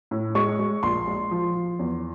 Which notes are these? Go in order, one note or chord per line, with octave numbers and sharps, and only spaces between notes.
A2
G#3 C#6
G#3
A#1 C6
G#3
F3
F3
E2